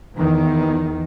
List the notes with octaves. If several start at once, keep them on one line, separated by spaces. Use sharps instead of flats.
E2 D#3